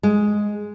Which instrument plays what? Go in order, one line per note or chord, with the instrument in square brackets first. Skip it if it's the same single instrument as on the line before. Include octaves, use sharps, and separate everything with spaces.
[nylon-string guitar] G#3